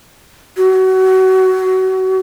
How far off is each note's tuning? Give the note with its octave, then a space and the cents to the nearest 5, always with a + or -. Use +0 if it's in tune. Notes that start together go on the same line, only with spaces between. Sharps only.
F#4 +25